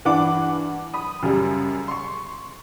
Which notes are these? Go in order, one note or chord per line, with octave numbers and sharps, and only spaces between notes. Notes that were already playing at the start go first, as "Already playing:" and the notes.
G2 E3 D4 F#5 D6
B5 D#6
F#2 C#3 G3
C6 C#6